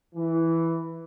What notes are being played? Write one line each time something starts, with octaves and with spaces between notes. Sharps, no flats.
E3